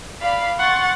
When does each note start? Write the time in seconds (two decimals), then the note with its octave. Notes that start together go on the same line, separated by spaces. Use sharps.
0.21 D5 F5 B5
0.59 F#5 C6 C#6 A6